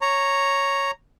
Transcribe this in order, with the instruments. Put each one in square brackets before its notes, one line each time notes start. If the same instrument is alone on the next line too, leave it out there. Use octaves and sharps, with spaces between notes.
[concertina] C#5 A#5